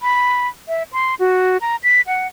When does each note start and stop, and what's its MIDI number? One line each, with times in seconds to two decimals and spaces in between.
0.01 0.48 83
0.68 0.83 76
0.93 1.15 84
1.19 1.57 66
1.61 1.76 82
1.84 2.01 95
2.07 2.27 78